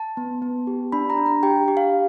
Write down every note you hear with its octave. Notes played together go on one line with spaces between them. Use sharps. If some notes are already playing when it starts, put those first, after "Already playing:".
Already playing: A5
B3
B3
G4
D4 B5
A#5
D4
A#5
G4 G5
G4
F5